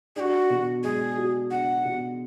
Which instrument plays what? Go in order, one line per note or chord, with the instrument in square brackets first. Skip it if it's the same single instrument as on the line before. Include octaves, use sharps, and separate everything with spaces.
[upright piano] D4 [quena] F#4 G#4
[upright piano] B2
[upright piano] G#3 [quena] G#4
[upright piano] F#4
[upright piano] D4 [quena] F#5
[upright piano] B2